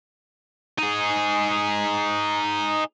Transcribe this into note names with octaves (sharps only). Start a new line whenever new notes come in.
D#4 G#4